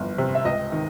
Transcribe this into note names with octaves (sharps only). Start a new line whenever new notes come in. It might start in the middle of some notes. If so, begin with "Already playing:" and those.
Already playing: G1 F2 E3
C3
E5
C#2 D#5
D#3